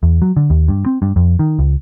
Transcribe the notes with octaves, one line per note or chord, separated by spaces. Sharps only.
E2
F#3
D3
D#2
G2
C4
G2
F2
D#3
C#2